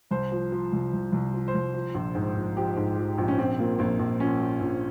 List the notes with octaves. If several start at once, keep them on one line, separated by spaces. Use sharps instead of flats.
C2 C5
F3
F3
C2
C2
C2
F3
C5
C2
F3
A#1
G#2
A#1
F3 G4
G#2
F3
A#1
C#4
A#1 C4
A#2 A#3
A#1 A#3
A#1
F3 C#4
F3
A#1